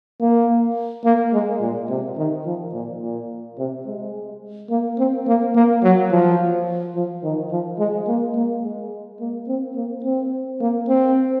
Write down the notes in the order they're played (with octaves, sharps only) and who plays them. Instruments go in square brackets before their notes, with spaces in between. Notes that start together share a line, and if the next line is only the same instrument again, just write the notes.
[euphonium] A#3
A#3
G#3
A#2
C3
D#3
F3
A#2
A#2
C3
G#3
A#3
C4
A#3
A#3
F#3
F3
F3
D#3
F3
G#3
A#3
A#3
G#3
A#3
C4
A#3
C4
A#3
C4